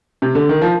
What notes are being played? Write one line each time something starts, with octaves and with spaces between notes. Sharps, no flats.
C3
D3
D#3
F3